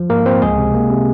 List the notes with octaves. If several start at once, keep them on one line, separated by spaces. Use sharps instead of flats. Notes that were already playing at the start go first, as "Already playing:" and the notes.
Already playing: F3
G#2 A#3 A#4
F3 C4 C5
C#2 G#3 G#4
C3
A#3
C3